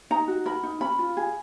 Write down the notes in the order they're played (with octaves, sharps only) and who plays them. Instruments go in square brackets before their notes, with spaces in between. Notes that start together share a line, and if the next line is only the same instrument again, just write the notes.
[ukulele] D#4 A#5
F#4
A#4 B5
D#4
C#4 B5
F4
G#4